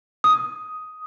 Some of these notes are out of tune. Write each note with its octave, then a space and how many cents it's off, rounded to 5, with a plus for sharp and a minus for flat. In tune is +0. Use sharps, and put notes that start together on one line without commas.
D#6 +10